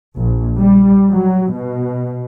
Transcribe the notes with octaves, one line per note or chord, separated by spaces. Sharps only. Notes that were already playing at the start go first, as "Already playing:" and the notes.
A#1
G3
F#3
B2